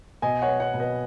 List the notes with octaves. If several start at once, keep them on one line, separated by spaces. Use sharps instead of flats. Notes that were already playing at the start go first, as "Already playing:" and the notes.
B2 D#5 G#5
C#5 F#5
B3
C#5 F#5
B2
B4 D#5